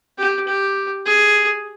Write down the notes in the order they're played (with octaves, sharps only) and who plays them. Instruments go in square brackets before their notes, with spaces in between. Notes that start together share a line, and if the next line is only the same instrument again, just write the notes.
[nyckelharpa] G4
G4
G#4